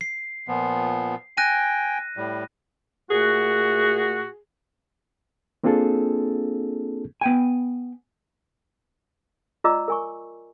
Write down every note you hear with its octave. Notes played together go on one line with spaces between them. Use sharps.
C7
A#2 F3 B3
G5 G#5 F#6 A#6 D#7
A2 G3
A#2 A3 F#4 G#4
A#3 C4 D4 F4 G#4 A4
B3 G5 G#5
F4 D5 D#5 A#5 D6 E6
A#4 G#5 C#6